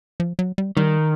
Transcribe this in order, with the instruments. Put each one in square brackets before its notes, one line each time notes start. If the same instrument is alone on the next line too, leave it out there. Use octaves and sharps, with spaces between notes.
[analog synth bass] F3
F#3
G3
[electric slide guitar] D#3 [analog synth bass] G3